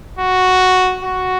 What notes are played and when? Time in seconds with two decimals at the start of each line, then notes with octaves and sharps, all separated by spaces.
0.19 F#4
1.04 F#4